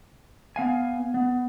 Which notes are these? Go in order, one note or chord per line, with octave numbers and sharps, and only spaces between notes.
B3 F5 G#5
B3